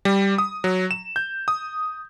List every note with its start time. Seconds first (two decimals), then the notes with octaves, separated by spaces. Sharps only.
0.05 G3
0.38 D#6
0.64 F#3
0.91 E7
1.16 G6
1.48 D#6